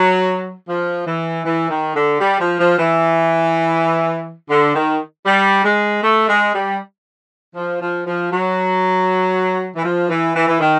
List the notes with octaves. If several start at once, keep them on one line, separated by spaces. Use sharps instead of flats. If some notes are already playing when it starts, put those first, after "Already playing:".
Already playing: F#3
F3
E3
E3
D#3
D3
G3
F3
F3
E3
D3
D#3
G3
G#3
A3
G#3
G3
F3
F3
F3
F#3
E3
F3
E3
E3
E3
D#3